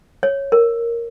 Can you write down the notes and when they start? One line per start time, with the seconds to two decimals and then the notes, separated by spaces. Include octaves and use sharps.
0.23 C#5
0.52 A#4